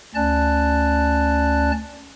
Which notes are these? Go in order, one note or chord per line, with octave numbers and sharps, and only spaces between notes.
D2 C#4 D5 A5 F#6